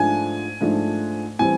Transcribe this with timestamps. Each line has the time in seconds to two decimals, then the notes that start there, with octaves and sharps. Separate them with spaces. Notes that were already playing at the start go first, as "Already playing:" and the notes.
Already playing: G#2 F3 A3 D4 G#5
0.61 G#2 F3 A3 D4
1.39 A2 E3 G3 C4 G#5